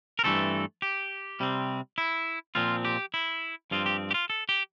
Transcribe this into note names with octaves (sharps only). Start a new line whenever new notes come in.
A#4
G2 E3 A3 C4 A4
G4
C3 G3 C4
E4
A#2 F3 C4 F4
G4
E4
G2 F3 C4 F4
G4
G4
F4
A4
G4